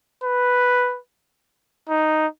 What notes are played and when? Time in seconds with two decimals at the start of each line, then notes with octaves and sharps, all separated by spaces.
0.24 B4
1.89 D#4